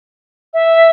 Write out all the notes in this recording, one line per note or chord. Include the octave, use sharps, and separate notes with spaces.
E5